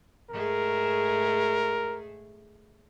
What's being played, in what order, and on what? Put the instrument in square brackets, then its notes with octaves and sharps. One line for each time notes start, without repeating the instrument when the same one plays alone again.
[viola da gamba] G#2 A3 G#4 [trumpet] A#4